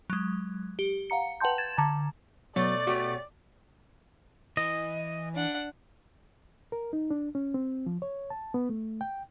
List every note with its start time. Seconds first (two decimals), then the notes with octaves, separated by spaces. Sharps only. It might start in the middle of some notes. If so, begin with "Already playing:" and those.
0.10 F#3 G#3
0.79 G4
1.10 F5 F#5 A#5 C#7
1.40 B4 F#5 G5 A5 C6 G6
1.58 G#6 A6 E7
1.78 D3 A5 A#5
2.56 B2 F#3 A3 C#5 D5 A6
2.87 A3 F#4 G4
4.57 E3 D#5
5.35 D4 F#5
6.72 A#4
6.93 D#4
7.11 D4
7.35 C#4
7.54 C4
7.86 F3
8.02 C#5
8.30 A5
8.54 B3
8.69 A3
9.01 G5